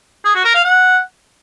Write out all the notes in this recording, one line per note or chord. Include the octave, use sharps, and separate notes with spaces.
G#4
F#4
A#4
F5
F#5